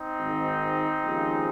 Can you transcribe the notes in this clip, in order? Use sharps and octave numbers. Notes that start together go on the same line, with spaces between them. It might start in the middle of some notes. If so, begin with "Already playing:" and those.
Already playing: C4 D#4
G#1 G#2 D#3
D#2 C#3 F3 G#3